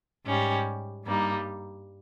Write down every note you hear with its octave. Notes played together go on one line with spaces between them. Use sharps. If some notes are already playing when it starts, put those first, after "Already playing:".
G#2 G3 C#4 G4
G2 G3 A#3 D#4